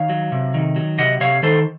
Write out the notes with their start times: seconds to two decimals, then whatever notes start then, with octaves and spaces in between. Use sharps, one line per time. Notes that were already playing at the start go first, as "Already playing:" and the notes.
Already playing: D#3 C#5 F5
0.09 F#3
0.32 C3
0.54 D#3
0.76 F#3
0.98 C3 D#5 F#5
1.21 C3 C#5 F5
1.43 D#3 A4 C5